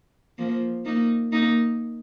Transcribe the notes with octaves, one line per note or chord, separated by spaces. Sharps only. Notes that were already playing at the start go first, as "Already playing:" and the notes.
F3 A#3
A#3 D#4
A#3 D#4